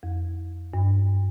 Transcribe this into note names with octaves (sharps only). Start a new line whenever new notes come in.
F2
G2